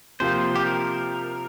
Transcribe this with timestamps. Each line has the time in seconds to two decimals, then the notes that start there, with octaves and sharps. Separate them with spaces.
0.20 C3 F3 A#3 F4 C5
0.56 G4
0.66 A#4